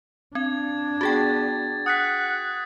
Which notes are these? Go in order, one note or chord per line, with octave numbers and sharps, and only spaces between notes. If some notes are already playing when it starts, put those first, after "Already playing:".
C4 D4 G#6
B3 F#4 G#4 G5 A6
F#5 D#6 F#6 B6